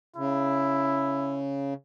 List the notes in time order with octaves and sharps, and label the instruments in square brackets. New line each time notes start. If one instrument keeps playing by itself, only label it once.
[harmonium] C#3 [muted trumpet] E4